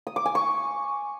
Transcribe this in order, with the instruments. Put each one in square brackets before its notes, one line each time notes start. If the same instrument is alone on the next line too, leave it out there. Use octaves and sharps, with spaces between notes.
[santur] D#6
D6
G#5
C#6